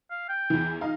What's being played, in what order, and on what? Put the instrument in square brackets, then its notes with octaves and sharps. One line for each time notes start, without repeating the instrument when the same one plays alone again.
[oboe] F5
G5
[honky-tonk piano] E2 E3
D#4 F5